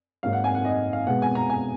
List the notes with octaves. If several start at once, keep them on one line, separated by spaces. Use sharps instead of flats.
G#2 F#3 A#3 F5
F#5
G#5
F#5
D#5
F5
B2 G#3 B3 F#5
G#5
A#5
G#5